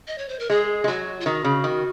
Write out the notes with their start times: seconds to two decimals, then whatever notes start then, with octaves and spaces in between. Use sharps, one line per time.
0.07 D#5
0.18 C#5
0.29 C5
0.39 A#4
0.50 G#3 G#4
0.84 G#3
0.87 F#3 F#4
1.20 F4
1.26 D#3 F#4
1.44 C#3
1.64 D#3